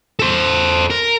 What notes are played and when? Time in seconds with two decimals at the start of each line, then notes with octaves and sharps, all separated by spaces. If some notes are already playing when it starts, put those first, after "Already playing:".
0.20 A4 C5
0.91 A#4